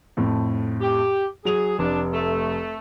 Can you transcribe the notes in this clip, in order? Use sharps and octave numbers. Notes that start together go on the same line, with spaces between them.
F2 A2
G4
F#3 G#4 F7
F1 D4
A3